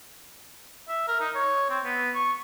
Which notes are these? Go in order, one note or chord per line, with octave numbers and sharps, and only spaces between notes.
E5
A#4
D#4
C#5
C4
B3
C#6